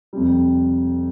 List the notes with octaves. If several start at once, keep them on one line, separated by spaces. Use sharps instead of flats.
F2 C3 G3